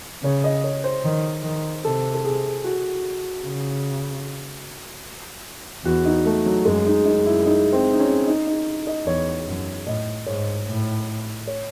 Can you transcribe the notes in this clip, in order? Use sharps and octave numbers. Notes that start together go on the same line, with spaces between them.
C#3 C#5
D#5
C#5
C5
D#3
D#3
C3 A4
A4
G#4
F#4
C#3
E2 F#4
D#4
A3
F#3
F#2 G#3
D#4
F#2 D#4
E4
D#4
C4
D#4
C#4
D#4
D#4
D#5
E2 C#5
F#2
A2 D#5
G#2 C#5
A2
C#5